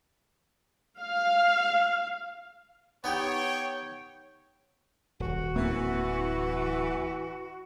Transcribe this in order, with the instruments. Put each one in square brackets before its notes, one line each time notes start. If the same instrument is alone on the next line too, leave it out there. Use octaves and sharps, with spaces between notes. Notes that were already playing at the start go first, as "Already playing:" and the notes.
[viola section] F5
[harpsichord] B3 D#4 G4 [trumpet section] C#5 G5
[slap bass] D#1 [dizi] F#4
[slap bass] D1 A#3 C4 [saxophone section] E3